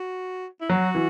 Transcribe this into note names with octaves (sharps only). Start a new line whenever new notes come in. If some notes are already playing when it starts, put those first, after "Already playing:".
Already playing: F#4
E4
F#3 F#4
E3